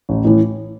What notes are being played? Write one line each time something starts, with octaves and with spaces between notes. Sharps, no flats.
A1
A2 E3